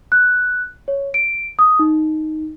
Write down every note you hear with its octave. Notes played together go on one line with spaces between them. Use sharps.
F#6
C#5
D7
D#6
D#4